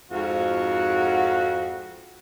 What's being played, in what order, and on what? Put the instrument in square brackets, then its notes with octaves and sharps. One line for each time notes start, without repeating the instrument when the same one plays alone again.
[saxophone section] F2 G#2 F#4